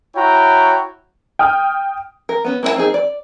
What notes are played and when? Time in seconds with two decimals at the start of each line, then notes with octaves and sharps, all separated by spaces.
0.16 E4 F#4 C#5 G5 A#5
1.39 G5 D#6 F6
2.29 A#4
2.45 B3 C#4
2.63 A#3 E4 C#5 A5
2.76 A#3 C4 D#4 G#4
2.94 D5